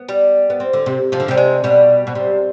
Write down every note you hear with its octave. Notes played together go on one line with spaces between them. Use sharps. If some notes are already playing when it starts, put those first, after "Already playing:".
Already playing: B3
G3
B3
C4
D3
C3
C3 F3
D3
C3 G3
G#3
B2 G3
B2
C3